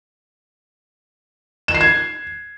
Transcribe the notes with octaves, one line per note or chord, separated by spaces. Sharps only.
E7
C7
G#6